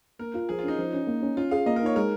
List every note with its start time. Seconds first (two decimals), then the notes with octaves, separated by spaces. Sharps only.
0.19 A#3 A#4
0.34 F4
0.49 F3 G#4
0.59 F4
0.63 C#4
0.68 D#4
0.78 F3
0.93 C#4
1.07 A#3
1.22 C#4
1.37 C#4 F4
1.51 G#4 F5
1.66 A#3 D#5
1.76 A#4
1.82 D#4 C#5
1.96 G#3 A#4